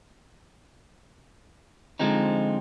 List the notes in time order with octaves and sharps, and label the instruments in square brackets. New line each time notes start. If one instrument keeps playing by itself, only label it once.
[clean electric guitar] D3 F3 G#3 C4 D#4